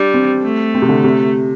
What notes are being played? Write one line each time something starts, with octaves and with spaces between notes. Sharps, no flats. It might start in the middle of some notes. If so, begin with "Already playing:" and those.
Already playing: G3 D4
C4
A3
C4
C3
D3
C3